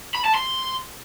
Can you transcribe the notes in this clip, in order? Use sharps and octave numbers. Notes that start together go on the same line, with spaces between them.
B5
A5
C6